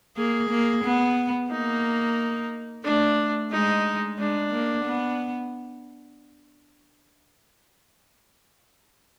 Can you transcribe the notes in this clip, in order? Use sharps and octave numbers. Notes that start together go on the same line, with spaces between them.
A#3 G#4
A#3
B3
A#3 D#4
A3 D4
G#3 D#4
G#3 D4
A#3
B3